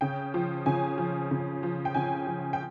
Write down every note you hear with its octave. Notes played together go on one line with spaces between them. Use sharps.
C#3 G5
F3
C#3 G#5
F3
C#3
F3
G5
C#3 G#5
F3
G5